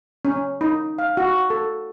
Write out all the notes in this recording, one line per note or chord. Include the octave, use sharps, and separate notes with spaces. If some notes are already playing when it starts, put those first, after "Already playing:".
C#4
D#4
F5
F#4
A4